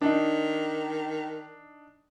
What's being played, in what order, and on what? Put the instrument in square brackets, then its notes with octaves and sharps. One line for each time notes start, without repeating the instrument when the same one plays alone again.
[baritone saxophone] D#3 [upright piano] D4 D#4